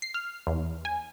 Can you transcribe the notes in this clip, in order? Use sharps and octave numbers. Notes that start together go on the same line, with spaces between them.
C7
F6
E2
G#5